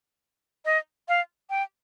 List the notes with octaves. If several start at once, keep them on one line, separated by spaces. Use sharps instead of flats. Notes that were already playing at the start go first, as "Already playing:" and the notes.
D#5
F5
G5